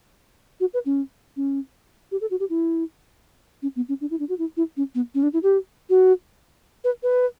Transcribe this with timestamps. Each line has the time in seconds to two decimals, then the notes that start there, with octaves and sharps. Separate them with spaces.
0.60 F#4
0.74 B4
0.86 C#4
1.36 C#4
2.11 G4
2.21 A4
2.31 F#4
2.40 G4
2.49 E4
3.62 C#4
3.76 B3
3.89 C#4
4.01 D4
4.10 E4
4.19 D4
4.29 F#4
4.38 E4
4.57 E4
4.77 C#4
4.95 B3
5.15 C#4
5.23 D4
5.33 E4
5.43 G4
5.90 F#4
6.84 B4
7.03 B4